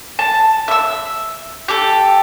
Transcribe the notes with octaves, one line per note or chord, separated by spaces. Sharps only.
A5
E5 E6
G4 A4